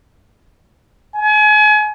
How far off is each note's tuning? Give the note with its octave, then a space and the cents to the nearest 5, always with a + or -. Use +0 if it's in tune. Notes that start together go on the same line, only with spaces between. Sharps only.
G#5 +35